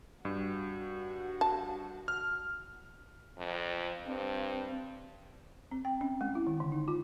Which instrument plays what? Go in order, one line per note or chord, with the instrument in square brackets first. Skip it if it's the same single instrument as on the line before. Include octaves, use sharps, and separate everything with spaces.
[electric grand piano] G2 [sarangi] F#4
[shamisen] A5
[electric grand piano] F6
[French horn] F2
[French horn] G2 [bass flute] C4
[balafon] C4
G5
C#4
G#3
E4
D#3
D3
D#4
F4